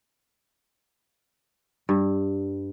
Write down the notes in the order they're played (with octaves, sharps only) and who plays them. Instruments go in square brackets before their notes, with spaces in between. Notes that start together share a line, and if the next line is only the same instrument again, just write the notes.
[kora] G2